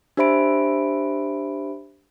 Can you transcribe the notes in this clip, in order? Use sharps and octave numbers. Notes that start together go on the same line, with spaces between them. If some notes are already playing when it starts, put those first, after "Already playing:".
D4 G4 C5 E5 B5 D7